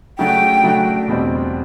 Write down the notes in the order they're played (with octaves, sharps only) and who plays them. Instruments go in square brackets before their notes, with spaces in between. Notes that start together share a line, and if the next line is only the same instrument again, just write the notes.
[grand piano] C#3 F#3 A3 D4 F#4 [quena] G5
[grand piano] C#3 F#3 A3 D4 F#4
E2 B2 G3 C4